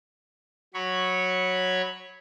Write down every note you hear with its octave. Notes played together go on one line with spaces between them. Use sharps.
F#3 C#5 B5 C#6